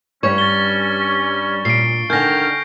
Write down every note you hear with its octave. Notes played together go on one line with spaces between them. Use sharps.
G2 G3 C#4 C#5 C#6
A6 G7
A#2 C7 D7
D3 D#3 G5 G#5 F6 G6 A#6